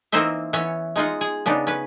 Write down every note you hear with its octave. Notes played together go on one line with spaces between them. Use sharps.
E3 A#3 C4 D#4 C5 E5
E3 B3 C#4 C#5
G#3 D#4 F4 F#5
G#4
C#3 B3 D4 D#4
C#4 B4